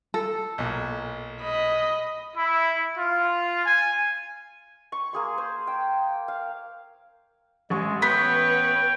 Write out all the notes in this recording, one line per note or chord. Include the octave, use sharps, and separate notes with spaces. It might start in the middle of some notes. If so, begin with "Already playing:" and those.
A4
B1 A#2
D#5 B5
E4
F4
G#5
C#6
A#3 G#4 C6
C5
G5
F5
A1 G#3 C#6
B3 B4 C#5 G5